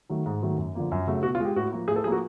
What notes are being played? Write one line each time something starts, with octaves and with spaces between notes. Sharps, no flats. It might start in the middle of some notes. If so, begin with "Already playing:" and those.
D#3 F#3 A3
G#2
D#3 F#3 A3
F#2
D3 F3 A#3
F#2
C#3 F#3 A3
B2 F#4
F4
G#3
G4
A2 F#4
F3 A#3
A2 G#4
A4
F3 A#3 F#4 G#4